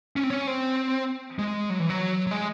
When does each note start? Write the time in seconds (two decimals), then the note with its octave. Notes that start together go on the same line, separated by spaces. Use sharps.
0.16 C#4
0.23 C4
0.30 C#4
0.47 C4
1.39 G#3
1.70 F#3
1.80 E3
1.90 F#3
2.27 F#3
2.31 G#3